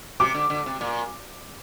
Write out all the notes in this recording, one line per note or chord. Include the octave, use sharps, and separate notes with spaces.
C3 D6
D3
D3
C3
A#2